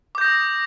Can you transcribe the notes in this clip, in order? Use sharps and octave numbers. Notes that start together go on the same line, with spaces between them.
D6 D#6 G6 A#6